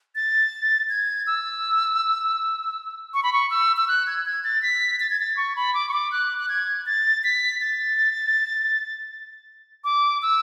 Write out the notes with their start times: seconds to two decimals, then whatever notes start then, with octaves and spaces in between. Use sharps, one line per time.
0.15 A6
0.89 G#6
1.27 E6
3.14 C#6
3.23 B5
3.33 C#6
3.50 E6
3.76 E6
3.88 F#6
4.07 G#6
4.25 G#6
4.44 A6
4.62 B6
5.00 A6
5.10 G#6
5.20 A6
5.37 C#6
5.56 B5
5.74 D6
5.89 C#6
5.93 D6
6.12 F#6
6.39 F#6
6.49 G#6
6.86 A6
7.24 B6
7.61 A6
9.84 D6
10.22 E6